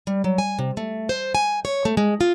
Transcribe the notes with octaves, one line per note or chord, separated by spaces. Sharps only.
G3
F#3
G#5
C3
A3
C5
G#5
C#5
A3
G#3
F4